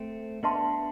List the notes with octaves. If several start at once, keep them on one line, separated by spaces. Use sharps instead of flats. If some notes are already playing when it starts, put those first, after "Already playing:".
Already playing: A3 C4
B3 D4 B4 E5 A5 C6